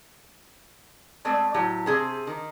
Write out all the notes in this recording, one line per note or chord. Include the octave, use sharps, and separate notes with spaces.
G#3 A3 C4 D5
A2 F#3 G4
C3 G#4 C5
D#3